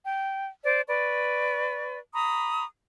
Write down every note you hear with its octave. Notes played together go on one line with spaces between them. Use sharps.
G5
C5 D5
B4 D5 C#6
A#5 B5 C#6 D#6